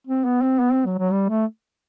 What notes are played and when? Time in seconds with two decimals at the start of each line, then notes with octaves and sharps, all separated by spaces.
0.07 C4
0.25 B3
0.42 C4
0.59 B3
0.72 C4
0.86 F#3
0.98 F#3
1.12 G3
1.29 A3